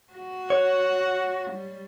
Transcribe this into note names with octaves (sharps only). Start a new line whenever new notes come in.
F#4
C#5 F#5
G3